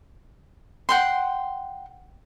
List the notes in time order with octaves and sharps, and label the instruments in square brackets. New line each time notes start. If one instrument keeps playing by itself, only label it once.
[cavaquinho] F#5 G5 C6